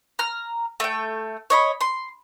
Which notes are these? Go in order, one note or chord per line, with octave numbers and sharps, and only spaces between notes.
A#5 F6
A3 G5
C#5 D#5 B5
C6